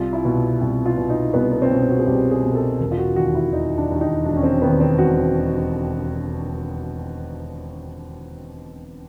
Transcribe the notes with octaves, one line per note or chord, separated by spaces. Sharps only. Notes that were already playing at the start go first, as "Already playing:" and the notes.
Already playing: C2 F4
E4
B2
C2
F4
B2
D#4
C2 B3
B3
C4
B2 C#4
F#4
G#4
C2 G4
G#4
B2
A#4
A4
E1 A#4
F4
F#4
D#2 D#3 F#4
E4
E1 D#4
D4
D#2 D#3
D#4
E1 D4
C#4
C4
D#2 D#3 B3
C4
E1 F#4